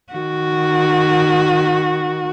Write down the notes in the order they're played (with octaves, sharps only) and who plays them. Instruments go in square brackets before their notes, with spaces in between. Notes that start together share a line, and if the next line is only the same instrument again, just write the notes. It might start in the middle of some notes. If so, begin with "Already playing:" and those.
[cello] D#3 F#4